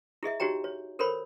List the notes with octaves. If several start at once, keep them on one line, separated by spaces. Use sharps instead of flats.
E4 G#4 D#5 E5
D#4 F#4 G4 C#5 G5 A#5
C#5
A4 A#4 C5 C#5 B5